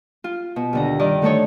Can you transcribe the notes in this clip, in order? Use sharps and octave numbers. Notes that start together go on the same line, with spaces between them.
F4
B2
D#2 D3 A#5
G2 D#3 D5 D#5
D3 A3 D#4 A4 C#5